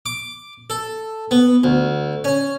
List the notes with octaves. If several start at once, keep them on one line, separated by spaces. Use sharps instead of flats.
D6
A4
B3
D2
C#4